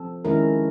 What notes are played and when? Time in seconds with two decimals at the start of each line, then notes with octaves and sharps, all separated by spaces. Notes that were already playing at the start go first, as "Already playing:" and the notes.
Already playing: F3 C4 A4
0.25 D#3 G#3 C#4 E4 A#4